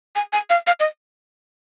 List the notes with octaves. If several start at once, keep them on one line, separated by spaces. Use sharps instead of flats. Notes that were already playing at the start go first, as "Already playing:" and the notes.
G#5
G#5
F5
F5
D#5